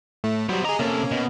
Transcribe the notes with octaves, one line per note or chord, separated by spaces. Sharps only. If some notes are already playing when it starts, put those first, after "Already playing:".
A2 A3
F#3 G3 B3 C5
G4 G#4 D#5 A#5
C3 A#3 C#4 A4
B2